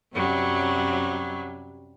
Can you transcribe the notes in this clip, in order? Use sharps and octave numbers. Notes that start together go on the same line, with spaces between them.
F#2 C3 F#3 G3